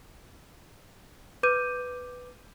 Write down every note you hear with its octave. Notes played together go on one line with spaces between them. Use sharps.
B4 D6 G6 D#7